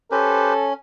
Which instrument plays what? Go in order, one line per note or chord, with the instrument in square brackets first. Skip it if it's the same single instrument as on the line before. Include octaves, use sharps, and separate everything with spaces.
[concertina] C#4 [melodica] G4 B4 C5 [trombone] A4